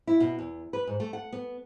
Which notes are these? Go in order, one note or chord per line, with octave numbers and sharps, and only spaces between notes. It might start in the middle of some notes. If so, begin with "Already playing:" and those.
E4
B2
E2
B4
G#2
A3
F#5
B3